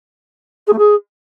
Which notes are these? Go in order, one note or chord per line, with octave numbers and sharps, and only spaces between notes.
G#4
A3
G#4